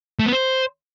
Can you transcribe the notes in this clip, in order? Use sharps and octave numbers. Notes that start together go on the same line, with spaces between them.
A3
B3
C5